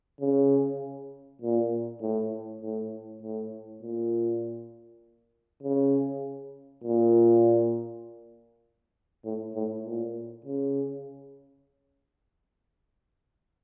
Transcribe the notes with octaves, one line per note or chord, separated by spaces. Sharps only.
C#3
A#2
A2
A2
A2
A#2
C#3
A#2
A2
A2
A#2
C#3